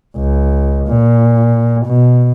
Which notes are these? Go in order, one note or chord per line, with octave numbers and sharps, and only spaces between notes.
C#2
A#2
B2